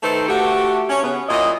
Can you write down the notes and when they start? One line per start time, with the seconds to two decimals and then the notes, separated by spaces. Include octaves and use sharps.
0.02 D#3 A3 D#4 A4 B4 C5
0.28 A3 F#4 G4
0.90 C#4
1.04 C#3 B3
1.28 A#2 F#3 E4 D#5